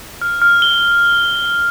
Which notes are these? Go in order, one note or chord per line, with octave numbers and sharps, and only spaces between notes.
F6
F6
G7